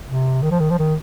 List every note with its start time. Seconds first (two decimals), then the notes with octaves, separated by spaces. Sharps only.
0.08 C3
0.42 D#3
0.51 F3
0.60 D#3
0.70 F3
0.79 D#3